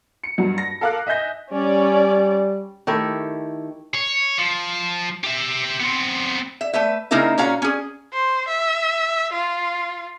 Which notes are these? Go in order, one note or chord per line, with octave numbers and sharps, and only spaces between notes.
C#7
G2 F#3
A#6
A4 A#4 F5 D6 F#6
D#5 E5 G#5 G6 A#6
G3 C#4 D5
D#3 A3 E4 G4
C#5
F3
G4 E5
B3 C4
E5
A3 B4 E5
C#3 A#3 D#4 E4 A#4 E5
A#2 C#4 F#4 F5 A#5
C#4 G#4
C5
E5
F4